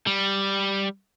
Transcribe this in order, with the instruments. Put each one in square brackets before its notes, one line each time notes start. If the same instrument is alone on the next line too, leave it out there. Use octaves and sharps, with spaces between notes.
[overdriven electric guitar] G3